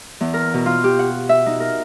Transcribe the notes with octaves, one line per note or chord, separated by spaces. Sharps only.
E2
A#4
B2
F4
G4
F#5
E5
D#4
A#4